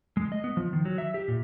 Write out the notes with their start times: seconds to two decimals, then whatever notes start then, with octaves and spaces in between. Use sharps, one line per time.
0.17 G#3
0.32 D#5
0.44 B3
0.57 F3
0.73 D#3
0.85 F#3
0.98 E5
1.14 G4
1.28 A#2